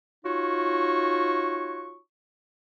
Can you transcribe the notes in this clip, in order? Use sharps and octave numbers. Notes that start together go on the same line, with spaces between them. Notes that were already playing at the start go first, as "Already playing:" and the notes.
D#4 F4 F#4 C#5 C#6